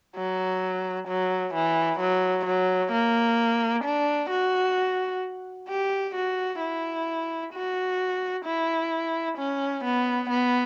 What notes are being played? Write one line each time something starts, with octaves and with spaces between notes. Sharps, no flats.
F#3
F#3
E3
F#3
F#3
A#3
D4
F#4
G4
F#4
E4
F#4
E4
C#4
B3
B3